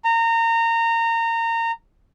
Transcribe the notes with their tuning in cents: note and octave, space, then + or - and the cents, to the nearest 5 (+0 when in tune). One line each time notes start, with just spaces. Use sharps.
A#5 -25